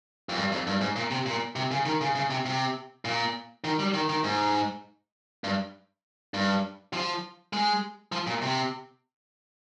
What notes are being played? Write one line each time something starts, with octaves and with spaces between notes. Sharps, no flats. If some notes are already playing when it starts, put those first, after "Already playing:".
F2
G2
F2
G2
G#2
A#2
C3
A#2
C3
C#3
D#3
C#3
C#3
C3
C3
A#2
D#3
G3
D#3
D#3
G#2
G2
G2
F3
G#3
F3
A#2
C3